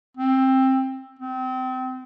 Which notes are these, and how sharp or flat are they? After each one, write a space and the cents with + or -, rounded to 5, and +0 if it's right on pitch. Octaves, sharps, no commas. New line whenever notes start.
C4 +15
C4 -30